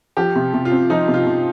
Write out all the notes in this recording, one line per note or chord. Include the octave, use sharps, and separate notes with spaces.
F3 G4
C3
C3
F4
C4
F3 D#4
C3
F4
C3